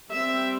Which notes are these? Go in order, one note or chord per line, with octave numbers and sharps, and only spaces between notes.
G3 C4 E5